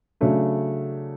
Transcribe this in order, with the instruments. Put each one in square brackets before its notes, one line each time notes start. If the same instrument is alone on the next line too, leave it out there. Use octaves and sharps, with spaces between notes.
[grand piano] C#3 F#3 A3 D4